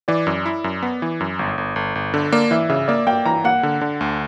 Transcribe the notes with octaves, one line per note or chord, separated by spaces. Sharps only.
E3 D5
F#2
E4
F#2
B3
E3
F#2
G1
G1
G1
G1
D3
A#3 D5
E3 E5
C#3 E5
A#3 D5
A#3 G5
E3 A#5
A#3 F#5
D3
D3
D2